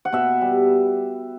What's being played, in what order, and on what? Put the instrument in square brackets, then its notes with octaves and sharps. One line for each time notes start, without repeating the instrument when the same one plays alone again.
[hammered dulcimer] F#5
B2 E5
G3